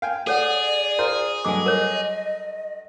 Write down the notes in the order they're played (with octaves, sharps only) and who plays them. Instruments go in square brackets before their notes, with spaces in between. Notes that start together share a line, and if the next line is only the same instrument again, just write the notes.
[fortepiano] F5 G5 G#5
[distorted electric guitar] G#4 [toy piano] A4 C#5 F#5 [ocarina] D5
[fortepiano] F4 A#4 C5
[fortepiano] G2 F#3 A3 [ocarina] D#5 [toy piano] G#5 D6
[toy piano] A#4 C#5 D6